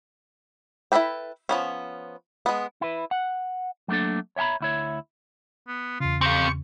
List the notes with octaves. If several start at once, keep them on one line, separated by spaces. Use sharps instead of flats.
E4 G#4 A4 B4 G5
F3 B3 C#4
G#3 B3
E4 B4
F#5
F#3 A3 A#3 D4 A4
C#5 E5 G5 A#5 B5
D2 E4 C#5
B3
E2 C#3 F4
C4 G4 F5 C#6